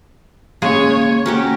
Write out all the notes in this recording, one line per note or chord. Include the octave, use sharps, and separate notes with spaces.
C#3 G#3 A#3 G#4 C#5
C#4 F#4 G4 A#5